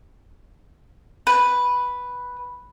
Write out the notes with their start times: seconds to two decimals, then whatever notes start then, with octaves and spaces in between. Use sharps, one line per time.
1.27 B4